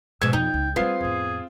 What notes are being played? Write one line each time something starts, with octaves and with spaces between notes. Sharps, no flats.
G#2 B2 F3 E6 G#6
F2 B2 D#4 G5
C#2
F#3 G3 B3 C4 F4 G#4 C7
F2 A2 G#4